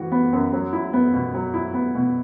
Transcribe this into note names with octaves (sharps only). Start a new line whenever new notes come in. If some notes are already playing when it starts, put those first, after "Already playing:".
Already playing: E3 F#4
B3
F#2
F#3
E4
B3
B2
F#3
E4
B3
B2